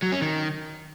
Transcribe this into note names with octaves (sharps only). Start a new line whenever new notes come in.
F#3
C#4
D#3